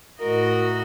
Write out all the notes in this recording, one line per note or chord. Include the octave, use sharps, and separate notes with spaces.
A2 F#4 A#4 D#5